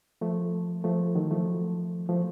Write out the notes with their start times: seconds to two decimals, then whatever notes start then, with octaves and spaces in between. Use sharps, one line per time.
0.21 F3 A3
0.84 F3 A3
1.15 D#3 F#3
1.31 F3 A3
2.09 F3 A3